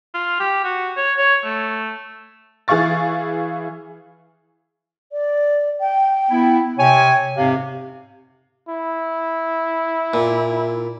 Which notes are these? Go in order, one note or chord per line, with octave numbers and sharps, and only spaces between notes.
F4
G4
F#4
C#5
C#5
A3
E3 G#4 F5 C#6 A6
D5
G5
B3 E4
C3 C#5 G5 G#5
F2 G#2 C3 F5
E4
A#2